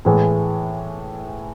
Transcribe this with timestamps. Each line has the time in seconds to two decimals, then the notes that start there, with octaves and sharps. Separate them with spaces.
0.05 A2 E3 G#3